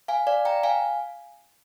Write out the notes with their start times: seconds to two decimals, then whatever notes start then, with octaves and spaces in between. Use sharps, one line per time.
0.08 F5 G#5
0.27 D5 F5
0.45 G5 A#5
0.63 F5 G#5